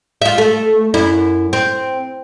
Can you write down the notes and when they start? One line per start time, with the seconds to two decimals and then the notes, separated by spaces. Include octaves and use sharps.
0.22 F4 E5
0.38 A3
0.94 F#2 E4
1.53 C4